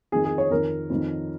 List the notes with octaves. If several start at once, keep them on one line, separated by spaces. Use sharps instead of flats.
F2 D#3 G#4
G#4
C#5
F2 D#3 A#4
F2 D#3